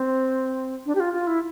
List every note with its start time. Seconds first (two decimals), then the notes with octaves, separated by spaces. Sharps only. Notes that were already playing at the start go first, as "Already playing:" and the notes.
Already playing: C4
0.86 D4
0.95 G4
1.00 F4
1.14 F4
1.27 E4